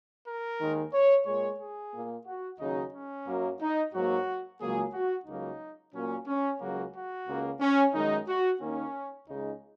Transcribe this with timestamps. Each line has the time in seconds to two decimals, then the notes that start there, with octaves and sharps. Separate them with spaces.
0.25 A#4
0.59 D#2 D#3 G#3
0.92 C#5
1.26 A#2 G#3 C#5
1.59 G#4
1.93 A#2 A#3
2.26 F#4
2.59 D#2 C#3 F#3 D#4
2.93 C#4
3.26 F#2 F#3 A#3
3.60 D#4
3.93 G#2 F#3 A#3 F#4
4.60 C#2 C#3 F#3 A#3 G#4
4.93 F#4
5.26 C#2 C#3 F#3 A#3 D#4
5.93 A#2 F#3 A#3 C#4
6.26 C#4
6.60 C#2 C#3 F#3 A#3 F#4
6.94 F#4
7.27 C#2 C#3 A#3
7.60 C#4
7.94 F#2 D#3 G#3 D#4
8.27 F#4
8.60 D#2 D#3 A#3 C#4
9.27 C#2 C#3 G#3 D#4